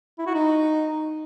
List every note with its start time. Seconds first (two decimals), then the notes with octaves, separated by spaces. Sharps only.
0.18 E4
0.26 F#4
0.34 D#4